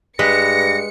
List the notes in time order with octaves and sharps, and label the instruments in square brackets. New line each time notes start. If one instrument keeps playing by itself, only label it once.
[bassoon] G2 [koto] G#3 B4 [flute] A#6 [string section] C#7